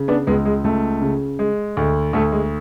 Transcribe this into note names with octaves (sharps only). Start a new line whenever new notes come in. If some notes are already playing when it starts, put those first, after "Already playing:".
Already playing: C#3
B3 D4
C#2 G#3 B3
G#3
C#2 A3
C#3
G#3
D2
D2 A3
G#3